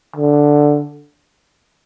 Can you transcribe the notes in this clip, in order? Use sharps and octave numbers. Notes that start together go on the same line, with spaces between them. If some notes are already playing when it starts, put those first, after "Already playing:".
D3